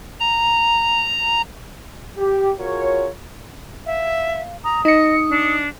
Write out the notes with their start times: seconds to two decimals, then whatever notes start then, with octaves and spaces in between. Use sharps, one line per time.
0.20 A#5
2.18 G4
2.59 F4 F#4 G#4 A#4 C#5
3.86 E5 F5
4.64 A#5 D#6
4.85 D#4 D#5 C#7
5.29 D4